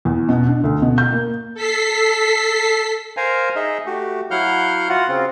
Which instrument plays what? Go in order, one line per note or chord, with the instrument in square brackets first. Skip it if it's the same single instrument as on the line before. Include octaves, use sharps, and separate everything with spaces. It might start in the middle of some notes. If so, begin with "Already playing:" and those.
[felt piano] E2
B2
D4
D2
B2
G6
A#3
[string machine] A4 B6 C7
[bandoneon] A#4 C5 F5 G#5 A#5
D#4 G#4 D#5 E5
A3 F#4 G4
F#3 E4 F5 F#5 F6 G6
F4 F#4 F#5
C#3 C4 F4